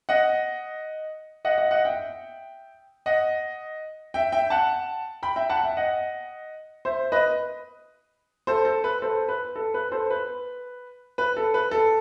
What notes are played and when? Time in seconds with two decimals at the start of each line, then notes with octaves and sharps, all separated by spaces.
0.09 D#5 F#5
1.45 D#5 F#5
1.58 D#5 F#5
1.71 D#5 F#5
1.85 E5 G5
3.06 D#5 F#5
4.14 E5 G5
4.32 E5 G5
4.50 F#5 A5
5.23 G5 B5
5.36 E5 G5
5.49 F#5 A5
5.64 E5 G5
5.77 D#5 F#5
6.85 C5 E5
7.12 B4 D#5
8.47 A4 C5
8.65 A4
8.84 B4
9.02 A4 C5
9.29 B4
9.56 A4
9.74 B4
9.92 A4 C5
10.10 B4
11.18 B4
11.37 A4
11.54 B4
11.71 A4